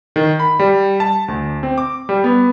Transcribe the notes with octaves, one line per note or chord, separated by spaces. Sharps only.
D#3
B5
G3
A5
D2
C4
D6
G3
B3